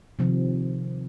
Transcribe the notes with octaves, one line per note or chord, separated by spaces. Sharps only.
C3 D#3 F3 C4